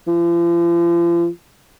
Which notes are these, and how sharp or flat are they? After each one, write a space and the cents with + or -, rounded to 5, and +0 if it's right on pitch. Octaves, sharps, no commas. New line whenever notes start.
F3 -40